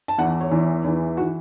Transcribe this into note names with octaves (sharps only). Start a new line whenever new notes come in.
A5
E2 E3 F#5
C#5
E2 E3
E2 E3
F#4
E3